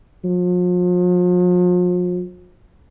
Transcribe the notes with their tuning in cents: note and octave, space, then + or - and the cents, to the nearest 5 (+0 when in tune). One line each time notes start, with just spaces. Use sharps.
F3 +40